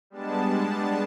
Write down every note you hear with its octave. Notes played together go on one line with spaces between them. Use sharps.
G3 G#3 B3 D4 A5